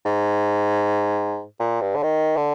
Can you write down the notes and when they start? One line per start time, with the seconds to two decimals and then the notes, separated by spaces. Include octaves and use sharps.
0.05 G#2
1.60 A#2
1.81 G2
1.95 D3
2.03 D#3
2.36 D3